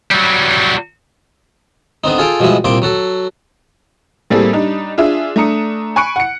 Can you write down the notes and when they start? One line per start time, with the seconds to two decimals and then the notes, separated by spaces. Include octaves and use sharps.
0.11 F#3 G3
2.04 D3 B3 C4 D#4
2.18 F4 G#4 A4 F5 G5
2.40 B2 F3 G3 G#3 E4
2.64 C2 A#2 C4 C6 D6
2.82 F#3 F#4 A4
4.30 A2 G3 A#3 C4 G#4 A4
4.53 G3 D4 D#4
4.98 D4 F4 G#4 E5
5.36 A3 D4 A#5 D#6 C#7
5.96 G#5 B5 C#6 F#6 C#7 D7
6.16 F#5 C#7